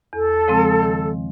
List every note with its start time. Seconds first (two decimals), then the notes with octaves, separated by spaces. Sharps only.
0.13 E2 A4
0.48 C#3 F3 G#3 C4
0.82 D#3